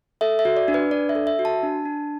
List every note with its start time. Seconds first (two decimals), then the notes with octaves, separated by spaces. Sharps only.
0.21 A4 E5
0.39 E5
0.45 F#4
0.57 D5
0.68 D4
0.74 B4
0.91 D4 D5
1.09 E5
1.15 A4
1.27 E5
1.39 F#4
1.45 A5
1.63 D4
1.85 D4